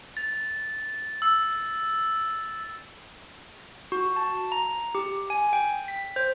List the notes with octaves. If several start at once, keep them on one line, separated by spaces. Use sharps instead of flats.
A6
E6
F#4
A5
A#5
G4
G#5
G5
B6
C5